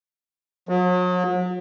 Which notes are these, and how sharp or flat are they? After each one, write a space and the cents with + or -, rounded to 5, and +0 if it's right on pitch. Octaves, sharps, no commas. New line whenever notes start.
F#3 -40